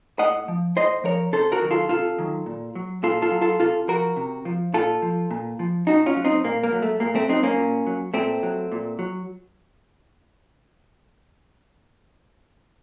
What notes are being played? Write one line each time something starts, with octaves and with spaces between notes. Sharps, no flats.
A2 D#5 F#5
F3
A2 C5 D#5
F3 A#4 C#5
C3 A4 C5
F#4 A#4
D#3 F#3
F4 A4
C3 F4 A4
D#3 F#3
A#2
F#3
A#2 F4 A4
F4 A4
F#3
F4 A4
C3 F4 A4
F3 F#4 A#4
C3
F3
A#2 F4 A4
F3
A#2
F3
A#2 D#4 F#4
C#4 F4
F#3
C4 D#4
A#2 A#3
A#3
F#3
A3
A#2 A#3
A3 C4
F#3 C4 D#4
A#3 C#4
A#2
F#3
A#2 A3 C4
F#3
A#2
F#3